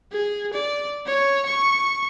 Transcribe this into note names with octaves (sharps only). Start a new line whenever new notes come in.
G#4
D5
C#5
C#6